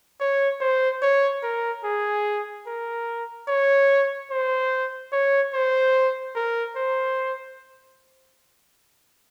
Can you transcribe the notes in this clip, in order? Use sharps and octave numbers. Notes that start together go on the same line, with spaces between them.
C#5
C5
C#5
A#4
G#4
A#4
C#5
C5
C#5
C5
A#4
C5